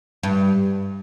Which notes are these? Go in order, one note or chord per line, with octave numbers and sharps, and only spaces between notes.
G2